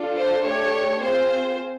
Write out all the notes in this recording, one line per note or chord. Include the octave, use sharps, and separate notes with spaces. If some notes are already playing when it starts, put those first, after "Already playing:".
Already playing: D4 F4 A4
C5
A3 D4 G4 C#5
C4 F4 G#4 C5